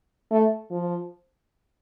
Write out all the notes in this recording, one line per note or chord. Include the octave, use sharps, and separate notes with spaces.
A3
F3